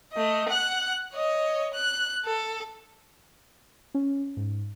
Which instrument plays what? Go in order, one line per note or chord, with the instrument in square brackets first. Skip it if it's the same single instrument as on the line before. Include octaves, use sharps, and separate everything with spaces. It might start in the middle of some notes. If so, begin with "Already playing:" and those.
[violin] A3 D#5
F#5 F#6
C#5 D#5
F#6
A4
[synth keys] C#4
G#2